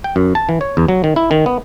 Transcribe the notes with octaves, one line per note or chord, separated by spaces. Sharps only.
G5
F#2
A5
E3
C#5
E2
F#3
D#3
E4
D#3
B3